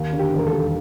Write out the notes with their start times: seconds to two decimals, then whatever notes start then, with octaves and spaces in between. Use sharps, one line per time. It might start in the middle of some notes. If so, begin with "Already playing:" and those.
Already playing: D#2
0.13 D3
0.19 G4
0.33 E1
0.39 A#4
0.47 A4
0.53 G3